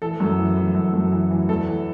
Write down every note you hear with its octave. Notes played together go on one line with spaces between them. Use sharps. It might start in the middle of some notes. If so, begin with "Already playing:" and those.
E3 A4
F#2
E3
E3
F#2
F#2
E3
E3
E2 A4
E3